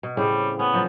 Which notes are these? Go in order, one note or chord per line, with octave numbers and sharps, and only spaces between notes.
B2
A2 C#3 G3 C4
B3 C#4
A#2 F3 F#3